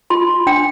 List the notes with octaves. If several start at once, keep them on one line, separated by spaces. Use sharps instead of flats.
F4 C6
F4
D4 G5